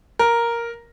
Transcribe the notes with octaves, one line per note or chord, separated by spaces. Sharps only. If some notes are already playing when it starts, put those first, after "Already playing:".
A#4